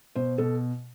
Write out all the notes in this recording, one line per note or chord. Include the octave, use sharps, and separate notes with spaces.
B2 C5
B2 A4